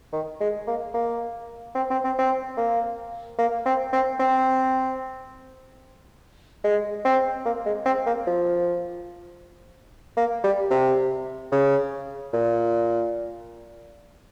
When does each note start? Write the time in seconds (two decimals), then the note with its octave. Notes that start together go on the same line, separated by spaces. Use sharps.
0.13 D#3
0.40 G#3
0.67 A#3
0.94 A#3
1.75 C4
1.90 C4
2.04 C4
2.18 C4
2.57 A#3
3.39 A#3
3.66 C4
3.93 C4
4.20 C4
6.64 G#3
7.05 C4
7.46 A#3
7.66 G#3
7.86 C4
8.06 A#3
8.27 F3
10.17 A#3
10.44 G3
10.71 C3
11.52 C#3
12.33 A#2